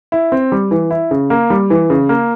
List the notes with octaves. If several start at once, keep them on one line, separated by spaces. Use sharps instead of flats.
E4
C4
G3
E3
E4
C#3
A#3
G3
E3
C#3
A#3